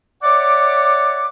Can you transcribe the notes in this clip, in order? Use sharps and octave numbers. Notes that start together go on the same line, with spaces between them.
C#5 D5 E5 F#5 D6